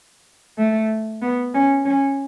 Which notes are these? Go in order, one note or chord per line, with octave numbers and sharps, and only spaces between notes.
A3
B3
C#4
C#4